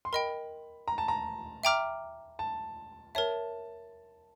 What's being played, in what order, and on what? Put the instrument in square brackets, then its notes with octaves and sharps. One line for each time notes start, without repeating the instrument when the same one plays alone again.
[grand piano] C6
[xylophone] A#4 D#5 G5 [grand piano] B5
[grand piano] A#5
A5
A#5
[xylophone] E5 G5 A#5 D6 F6
[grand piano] A5
[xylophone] A#4 C#5 E5 [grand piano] A5